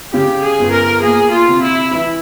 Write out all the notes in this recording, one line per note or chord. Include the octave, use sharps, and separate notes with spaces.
C#3 G4
G#4
G1
A#4
A#3 G#4
F4
C3
E4
E3